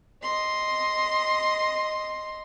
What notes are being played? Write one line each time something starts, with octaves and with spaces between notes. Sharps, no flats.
D#5 C6